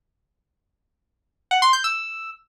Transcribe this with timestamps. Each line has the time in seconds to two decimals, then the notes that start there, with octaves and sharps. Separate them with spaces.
1.51 F#5
1.62 C6
1.73 G6
1.84 E6